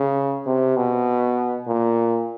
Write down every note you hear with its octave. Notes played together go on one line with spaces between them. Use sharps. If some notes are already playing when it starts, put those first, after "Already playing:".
Already playing: C#3
C3
B2
A#2